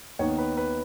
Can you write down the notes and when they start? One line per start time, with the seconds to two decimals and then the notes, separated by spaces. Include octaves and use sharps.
0.19 D#2 D#3 B3 C#5
0.38 B4
0.57 B4